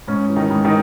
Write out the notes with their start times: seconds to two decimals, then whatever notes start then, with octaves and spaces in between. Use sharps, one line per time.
0.08 G#2 C#4
0.29 E3
0.36 D#3 D#4
0.50 G#2
0.65 D#3 D#4